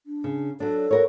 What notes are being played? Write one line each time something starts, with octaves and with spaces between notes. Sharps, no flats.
D4
C#3
F#3 D4 A4
F#4 A#4 C#5